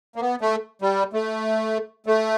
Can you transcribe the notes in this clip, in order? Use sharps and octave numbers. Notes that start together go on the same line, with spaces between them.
A#3
B3
A3
G3
A3
A3